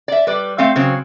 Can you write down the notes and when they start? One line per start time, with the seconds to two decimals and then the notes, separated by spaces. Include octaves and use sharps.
0.08 D5 E5
0.27 G3 B4 D5
0.58 A3 C4 F5
0.76 C#3 F#3 C4